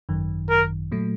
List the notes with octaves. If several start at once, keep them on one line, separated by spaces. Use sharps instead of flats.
G#1 F#2 D#3
A#4
A#2 F#3 A3